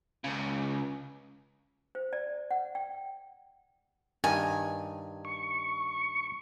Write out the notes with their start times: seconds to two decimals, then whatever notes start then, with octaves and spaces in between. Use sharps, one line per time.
0.24 C#2 C#3
1.95 C5
2.13 D5
2.51 F#5
2.75 G5
4.24 G2 D#3 G#5
5.25 C#6